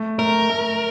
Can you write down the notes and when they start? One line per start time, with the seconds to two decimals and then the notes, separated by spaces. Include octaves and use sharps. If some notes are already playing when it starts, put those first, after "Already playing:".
Already playing: A3
0.18 A3 A#4
0.49 A3